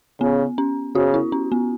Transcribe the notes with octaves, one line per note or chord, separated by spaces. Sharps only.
C#3 B3
C#4
C#3 F#4
E4
C#4
B3